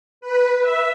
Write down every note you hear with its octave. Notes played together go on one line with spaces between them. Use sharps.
B4
E5